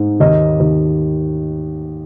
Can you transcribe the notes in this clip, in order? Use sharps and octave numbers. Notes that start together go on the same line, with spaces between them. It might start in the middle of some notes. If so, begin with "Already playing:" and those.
Already playing: G#2
D#2 D#5
D#2